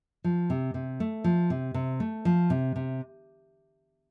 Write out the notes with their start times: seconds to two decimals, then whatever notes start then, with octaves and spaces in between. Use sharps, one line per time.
0.24 F3
0.50 C3
0.74 C3
1.00 A3
1.24 F3
1.50 C3
1.74 C3
2.00 A3
2.25 F3
2.50 C3
2.76 C3